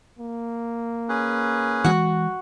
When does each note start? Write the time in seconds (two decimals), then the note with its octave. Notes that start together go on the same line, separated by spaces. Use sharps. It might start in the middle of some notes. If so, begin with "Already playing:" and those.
0.19 A#3
1.09 C#4 G#4 B4
1.84 E3 G#3 F#4 F#5